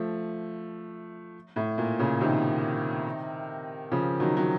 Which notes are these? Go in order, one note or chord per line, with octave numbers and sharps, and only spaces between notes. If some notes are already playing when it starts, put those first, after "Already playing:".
Already playing: F3 A3
A2
A#2
A#2 C#3
C3 D#3
C#3 F3
D#3 F#3
F#3